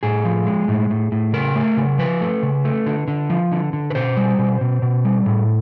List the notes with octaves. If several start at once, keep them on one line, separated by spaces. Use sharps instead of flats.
A2 G#4
F3
G#3
A2
A2
A2
C#3 A#4
A3
C#3
F3 B4
A3
C#3
A3
D3
D3
F3
D3
D3
B4
B2 C5
G3
B2
B2
B2
G3
A2